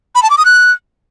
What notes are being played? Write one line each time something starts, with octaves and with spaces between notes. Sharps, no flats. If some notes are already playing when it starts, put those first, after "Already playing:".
B5
A5
D6
D#6
F#6